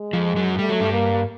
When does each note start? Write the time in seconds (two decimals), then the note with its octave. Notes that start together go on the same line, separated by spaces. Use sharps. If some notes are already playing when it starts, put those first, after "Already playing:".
Already playing: G#3
0.13 F2 F3
0.36 F#2 F#3
0.59 G3 A3
0.69 F#3
0.80 G2 G3
0.93 A#3